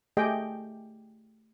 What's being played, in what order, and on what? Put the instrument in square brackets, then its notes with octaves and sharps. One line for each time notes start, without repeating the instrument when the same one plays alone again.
[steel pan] A3 G4 G#4 D#5 G5